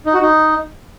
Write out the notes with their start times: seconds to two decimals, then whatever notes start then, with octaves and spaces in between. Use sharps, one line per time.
0.06 D#4
0.14 F#4
0.22 D#4